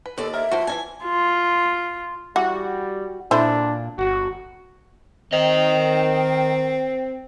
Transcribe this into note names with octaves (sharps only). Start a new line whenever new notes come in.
B4
D#2 A4 D5
A#4 E5
F3 F#4 B4 C5
E3 D#4 G#5 A5
F4
E3 G3 F#4 F#5
A#2 D4 E4 A4 C5
G1 F#4
D#3 C4 A#4 D#5